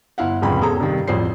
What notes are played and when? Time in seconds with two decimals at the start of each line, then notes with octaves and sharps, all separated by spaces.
0.18 G1 E4 F5 F#5
0.42 F1 F2 G#2 C#3 G5 B5
0.61 E1 G#4 A4 A#5
0.80 G2 C3 D#3
1.07 A1 F2 C5 D5 C7